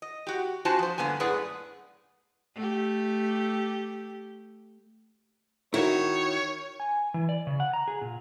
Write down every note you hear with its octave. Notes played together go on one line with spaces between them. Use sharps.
D#5
F#4 G4
D4 F4 F#4 C5 G#5 A5
F3 C5
G2 D3 A#3 B3 G#5
F#2 A2 G#4 B4 D5 F#5
A3 G4
D#3 E4 F#4 C#5
G#5
E3
D5
C#3
F#5
A#5
G#4
A#2